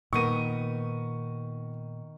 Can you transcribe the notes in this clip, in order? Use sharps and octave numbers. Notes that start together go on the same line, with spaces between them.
A#2 D#3 B3 A#4 C#6 D#7